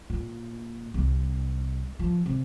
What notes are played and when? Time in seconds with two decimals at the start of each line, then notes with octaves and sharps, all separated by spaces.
0.10 A#2
0.94 C2
1.99 F3
2.26 C3